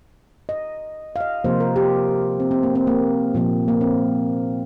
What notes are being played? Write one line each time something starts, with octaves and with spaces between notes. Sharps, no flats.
D#5
F5
D#5
C3 F3 A#3 C5
A#4
G4
C4
C4
A#3
C4
A#3
A#2 F3 A#3
A#3
C4